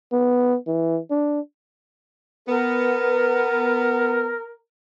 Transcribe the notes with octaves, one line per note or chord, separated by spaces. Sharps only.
B3
E3
D4
B3 A#4